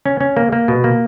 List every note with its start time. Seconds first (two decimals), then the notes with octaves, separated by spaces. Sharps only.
0.05 C#4
0.21 C#4
0.37 A#3
0.52 A#3
0.68 B2
0.84 A#3